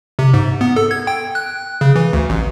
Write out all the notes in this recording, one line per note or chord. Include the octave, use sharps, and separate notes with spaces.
C3
G#2
B3
A4
G#6
G5
F#6
C#3
E3
D2
A1